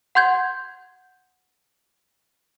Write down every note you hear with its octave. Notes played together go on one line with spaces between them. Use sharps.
F#5 C6 G6 G#6